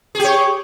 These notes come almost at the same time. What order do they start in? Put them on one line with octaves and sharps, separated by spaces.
G#4 G4 C#5